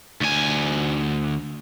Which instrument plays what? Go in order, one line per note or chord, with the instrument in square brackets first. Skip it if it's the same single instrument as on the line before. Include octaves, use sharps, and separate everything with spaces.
[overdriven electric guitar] D2 G#5